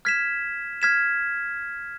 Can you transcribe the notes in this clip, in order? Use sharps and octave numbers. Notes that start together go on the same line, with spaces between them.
F6 G#6 B6 E7
F6 G#6 B6 E7